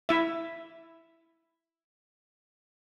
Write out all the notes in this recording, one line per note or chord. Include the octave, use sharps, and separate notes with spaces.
E4 E5